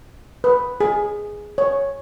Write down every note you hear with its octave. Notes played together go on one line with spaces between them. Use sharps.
B4
G#4
C#5